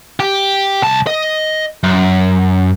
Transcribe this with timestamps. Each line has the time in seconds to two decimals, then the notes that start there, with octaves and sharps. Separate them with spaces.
0.20 G4
0.82 C2 A5
1.07 D#5
1.83 F#2